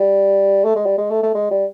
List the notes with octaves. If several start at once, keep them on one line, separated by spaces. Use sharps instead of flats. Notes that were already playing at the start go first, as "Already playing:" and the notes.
Already playing: G3
A3
G#3
G3
G#3
A3
A3
G#3
G3